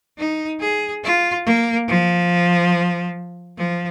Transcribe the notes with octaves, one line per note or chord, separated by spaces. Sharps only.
D#4
G#4
F4
A#3
F3
F3